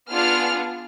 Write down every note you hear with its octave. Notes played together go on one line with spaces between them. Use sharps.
B3 D4 F4 G#4 F6